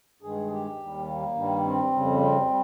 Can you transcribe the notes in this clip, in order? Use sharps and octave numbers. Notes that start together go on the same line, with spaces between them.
G2 D#3 G#3 G#4
G4
D#2 D#3 G3
A#3
G2 D#3 G3
C4
F2 C#3 G3
C4
G3